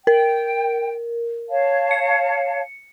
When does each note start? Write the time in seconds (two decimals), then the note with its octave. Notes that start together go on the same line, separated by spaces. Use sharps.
0.07 A#4 G5
1.49 C#5 F5 A5
1.91 C#7